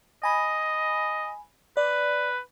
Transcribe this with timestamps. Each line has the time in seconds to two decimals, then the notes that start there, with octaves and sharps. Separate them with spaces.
0.23 D#5 G#5 B5
1.77 B4 D5